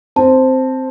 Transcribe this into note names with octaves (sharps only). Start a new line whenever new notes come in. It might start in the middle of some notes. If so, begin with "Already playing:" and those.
C4 A5